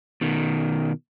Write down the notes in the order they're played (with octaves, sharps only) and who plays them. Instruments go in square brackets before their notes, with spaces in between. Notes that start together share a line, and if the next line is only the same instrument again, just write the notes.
[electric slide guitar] B2 D#3